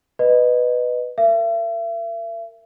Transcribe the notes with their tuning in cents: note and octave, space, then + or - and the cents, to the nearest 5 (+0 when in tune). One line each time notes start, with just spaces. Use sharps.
B4 +0 D#5 -20
A#4 -20 E5 +40